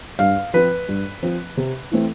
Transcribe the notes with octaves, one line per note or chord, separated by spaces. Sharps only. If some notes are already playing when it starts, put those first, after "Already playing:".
G2 F5
F3 C4 B4
G2
F3 C4
C3
E3 A3 C4